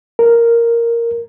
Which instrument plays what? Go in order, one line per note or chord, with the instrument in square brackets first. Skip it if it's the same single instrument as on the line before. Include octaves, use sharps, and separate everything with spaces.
[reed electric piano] A#4